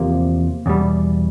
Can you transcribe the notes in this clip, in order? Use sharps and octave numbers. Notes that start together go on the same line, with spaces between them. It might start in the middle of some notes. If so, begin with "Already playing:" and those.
Already playing: E2 C3 F3 A#3
E2 B2 G3